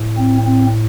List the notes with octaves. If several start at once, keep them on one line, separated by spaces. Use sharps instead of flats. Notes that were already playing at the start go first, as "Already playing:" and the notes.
Already playing: A2
C4
C4